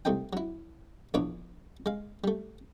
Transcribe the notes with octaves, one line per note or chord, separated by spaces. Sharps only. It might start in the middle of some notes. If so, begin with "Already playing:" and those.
C2 A3 C4 D#4 G5
F#3 E4
A#1 E2 D4 B4 C#5 D6
G#3 F5
G3 A3